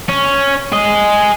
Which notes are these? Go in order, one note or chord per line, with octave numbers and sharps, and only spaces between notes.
C#4
G#4 D#5